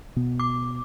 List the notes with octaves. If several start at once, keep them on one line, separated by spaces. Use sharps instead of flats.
B2 B3
D6